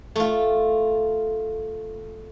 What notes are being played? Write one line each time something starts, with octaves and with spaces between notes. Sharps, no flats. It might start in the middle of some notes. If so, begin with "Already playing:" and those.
A3 F4